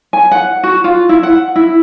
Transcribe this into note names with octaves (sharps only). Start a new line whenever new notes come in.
G#5
F#5
F#4
F4
E4
F#5
E4